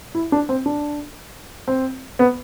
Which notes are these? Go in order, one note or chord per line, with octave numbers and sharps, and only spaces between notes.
E4
D4
C4
D4
C4
B3